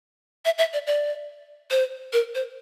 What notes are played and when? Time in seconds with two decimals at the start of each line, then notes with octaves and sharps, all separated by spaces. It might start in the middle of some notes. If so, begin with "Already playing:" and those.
0.45 E5
0.58 E5
0.73 D5
0.87 D5
1.71 C5
2.13 A#4
2.35 C5